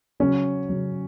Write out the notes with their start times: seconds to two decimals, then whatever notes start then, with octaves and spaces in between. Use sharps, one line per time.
0.20 C#3 F#3 C#4
0.69 C#3 F#3